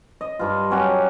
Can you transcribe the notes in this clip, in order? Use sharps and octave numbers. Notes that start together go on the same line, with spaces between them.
D#5
G2 F4
F#3 C#4 F#4 G4